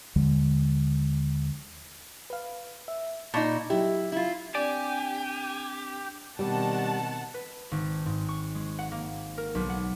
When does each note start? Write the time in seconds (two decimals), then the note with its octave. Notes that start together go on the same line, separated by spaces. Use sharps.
0.16 D#2 D3 F3 G#3
2.30 B4 F5
2.88 E5
3.34 A#2 D#4 A5 B5 C#6
3.70 F#3 E4 G4
4.12 E4 F4
4.55 C4 D4 G4 D5 G#5
6.39 B2 D#3 G3 C4 D5 F#5 A5
7.34 B4
7.71 G#1
8.06 G#2
8.29 C#6
8.55 G#3
8.79 F#5
8.92 A#3
9.38 A#4
9.55 B1
9.69 F#5